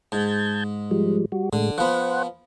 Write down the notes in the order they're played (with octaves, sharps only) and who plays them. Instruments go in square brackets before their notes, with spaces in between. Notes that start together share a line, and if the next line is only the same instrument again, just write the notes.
[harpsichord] G#2 [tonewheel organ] A5 G6 G#6
[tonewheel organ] F3 G3 G#3
G3 F#4
[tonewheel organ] A2 G#3 [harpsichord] D3
[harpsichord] F3 B3 [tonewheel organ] C5 F#5